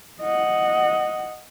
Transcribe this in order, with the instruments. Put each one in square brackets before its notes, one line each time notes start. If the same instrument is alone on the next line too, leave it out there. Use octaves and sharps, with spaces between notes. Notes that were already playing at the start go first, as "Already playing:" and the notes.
[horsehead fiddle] D#5 F#5